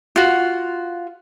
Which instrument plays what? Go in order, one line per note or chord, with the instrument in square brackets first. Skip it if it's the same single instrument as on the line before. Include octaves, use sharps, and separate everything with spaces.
[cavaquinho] F4 F#4